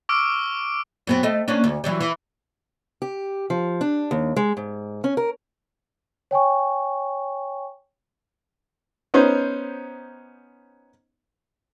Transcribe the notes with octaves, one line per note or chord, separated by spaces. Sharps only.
C#6 D6 E6 F6 D7
F#2 B3 C4
A3 D#5
A#3 C#4 D4
D2
E3 F#3 G3
E3
G4
F3
D4
D#2
G#3
G#2
C#4
A#4
C#5 G5 G#5 C#6
B3 C#4 D#4 C5